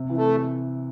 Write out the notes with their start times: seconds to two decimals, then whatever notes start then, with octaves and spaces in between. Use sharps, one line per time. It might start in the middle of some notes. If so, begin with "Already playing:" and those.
Already playing: C3
0.10 E3
0.17 A3